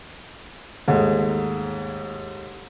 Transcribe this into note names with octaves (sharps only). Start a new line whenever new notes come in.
D#2 G#2 A3